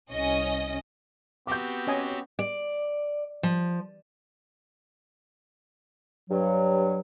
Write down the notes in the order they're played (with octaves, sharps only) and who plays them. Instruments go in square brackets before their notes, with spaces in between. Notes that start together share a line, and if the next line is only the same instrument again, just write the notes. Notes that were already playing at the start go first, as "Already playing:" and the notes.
[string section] C2 C#4 D#5
[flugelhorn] B3 [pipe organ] C4 F#4 G4 [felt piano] D6 G6
[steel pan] C#4 D#5 G#5
[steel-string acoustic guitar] D5
F3
[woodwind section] G2 F#3